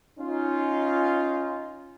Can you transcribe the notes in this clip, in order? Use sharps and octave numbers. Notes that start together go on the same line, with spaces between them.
C#4 D#4 F4